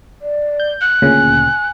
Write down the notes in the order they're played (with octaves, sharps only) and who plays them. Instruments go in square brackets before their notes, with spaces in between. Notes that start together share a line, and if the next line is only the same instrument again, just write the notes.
[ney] D5
[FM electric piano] G6
[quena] F#6
[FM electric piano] D2 A#2 C#3 [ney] G#5